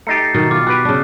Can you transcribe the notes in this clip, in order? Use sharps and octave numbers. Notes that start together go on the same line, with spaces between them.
A3 D#4 G4 A6 C7 C#7
B2 D#3
F4 D6
F#4 G4 B4 F#6
C#3 D4